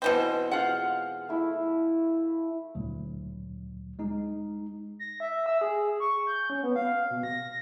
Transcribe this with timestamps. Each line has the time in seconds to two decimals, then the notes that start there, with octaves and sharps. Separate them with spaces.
0.02 B2 E3 C4
0.51 G#3 F4 F5 F#5
1.28 A3 E4
2.75 D2 A#2 F#3
3.99 G#3 D#4
4.99 A#6
5.20 E5
5.46 E6
5.61 G#4
6.00 C#6
6.27 G6
6.50 C#4
6.63 B3
6.76 F5
7.11 B2
7.23 A#6